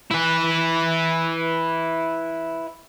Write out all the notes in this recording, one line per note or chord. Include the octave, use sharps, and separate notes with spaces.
E4 B4